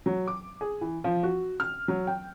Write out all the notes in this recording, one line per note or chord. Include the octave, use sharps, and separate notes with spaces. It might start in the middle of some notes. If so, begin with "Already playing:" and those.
F#3
D6
G#4
E3
F3
F#4
F6
F#3
G5